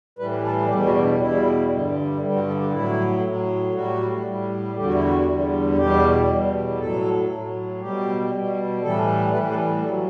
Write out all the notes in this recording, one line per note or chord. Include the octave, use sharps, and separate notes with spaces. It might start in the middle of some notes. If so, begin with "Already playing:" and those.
A2 E3 G3 B4
A4
E2 B2 G3 G4
F#4
D4
E2 B2 G3 E4
G2 D3 G3
G2 D3 G3 E4
F#4
A4
G4
A2 F#3 E4
A2 F#3
A2 G3 F#4
A2 G3
E2 D3 G3 G4
F#4
E4
F#4
E2 D3 G3
E2 B2 G3 G4
E2 B2 G3
A2 F#3 A4
A2 F#3
B2 G3 G4
B2 G3
A2 E3 G3 A4
A2 E3 G3 B4
A4
A2 F#3 A4